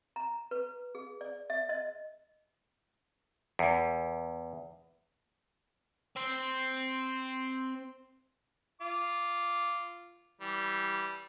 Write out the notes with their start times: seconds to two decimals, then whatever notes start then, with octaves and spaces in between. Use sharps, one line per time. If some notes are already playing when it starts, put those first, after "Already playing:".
0.16 A#5
0.51 B4
0.95 G#4
1.21 D5
1.50 E5
1.69 D#5
3.59 E2
6.16 C4 C5
8.81 F4 D6
10.41 E3 G3